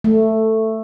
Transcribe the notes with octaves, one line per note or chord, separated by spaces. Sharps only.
A3